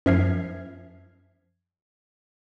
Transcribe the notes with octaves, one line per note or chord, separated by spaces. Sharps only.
F#2 F3 E5 F6 G#6 C7